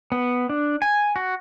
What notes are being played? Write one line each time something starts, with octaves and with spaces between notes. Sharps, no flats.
B3
D4
G#5
F#4